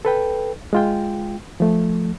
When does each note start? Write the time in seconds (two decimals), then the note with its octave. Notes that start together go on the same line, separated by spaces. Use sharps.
0.05 A4 B4 G5
0.73 G#3 F4 G5
1.60 F3 A3